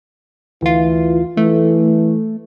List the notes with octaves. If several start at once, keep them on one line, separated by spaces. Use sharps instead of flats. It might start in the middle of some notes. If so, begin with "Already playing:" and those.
D2 E3 F4
E3 A3